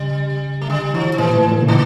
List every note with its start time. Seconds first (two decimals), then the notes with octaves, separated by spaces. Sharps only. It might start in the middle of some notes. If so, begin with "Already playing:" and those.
Already playing: C#3 G3
0.61 A3
0.69 D3 G3
0.94 E3 F3
1.14 F3
1.18 A#2 E3
1.36 A2
1.52 A#2
1.61 D3
1.68 C#3 E3